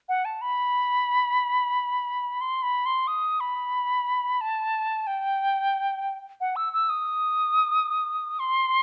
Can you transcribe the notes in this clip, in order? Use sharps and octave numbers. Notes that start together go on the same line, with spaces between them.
F#5
A5
B5
C6
B5
C6
D#6
B5
A5
G5
F#5
E6
E6
D#6
C6